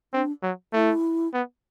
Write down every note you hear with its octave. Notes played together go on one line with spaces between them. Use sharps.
C4 D4
F#3
A3 E4
B3